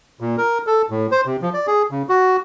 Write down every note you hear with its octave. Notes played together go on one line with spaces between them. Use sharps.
A#2
A#4
A4
A2
C5
C3
F3
D5
G#4
C#3
F#4